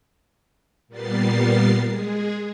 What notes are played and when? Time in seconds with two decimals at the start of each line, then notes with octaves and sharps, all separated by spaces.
0.88 A#2 G3 A#3 B3 A6 C7
1.87 G#3 G#4